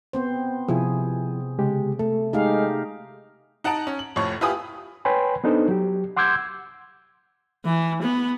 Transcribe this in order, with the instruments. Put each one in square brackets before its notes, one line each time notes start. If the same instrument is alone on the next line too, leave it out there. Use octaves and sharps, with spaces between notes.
[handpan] B3 C4 C5
[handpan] C3 G#4 [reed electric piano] F3 E4
[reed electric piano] C#3 G#3 G4
[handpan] A3 [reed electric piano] A4
[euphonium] G#3 [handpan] D#4 G4 F5
[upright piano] D#4 F#5 A5 A#5 D7
C#4
F#7
F1 F2 A2 C#5 C#6
E4 F4 G4 B4 G#5 D#6
[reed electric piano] B4 C#5 G5 G#5 B5 C6
B3 D4 D#4 A4 C5
F#3 G4
F#5 C6 D6 E6 G6 G#6
[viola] E3
B3